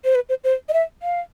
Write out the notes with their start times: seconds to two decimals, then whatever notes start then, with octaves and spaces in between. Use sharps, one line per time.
0.05 C5
0.15 B4
0.29 C5
0.44 C5
0.69 D#5
0.73 E5
1.03 F5